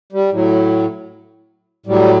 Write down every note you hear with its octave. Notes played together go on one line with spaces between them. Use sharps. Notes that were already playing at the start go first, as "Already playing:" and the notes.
G3
A2 F#3
A2 F#3 G3